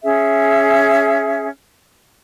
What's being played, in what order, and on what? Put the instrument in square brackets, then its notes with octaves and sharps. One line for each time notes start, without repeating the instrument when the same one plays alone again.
[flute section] C#4 G#4 E5